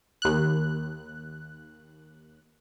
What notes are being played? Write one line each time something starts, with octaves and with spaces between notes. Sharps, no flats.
D#2 F#6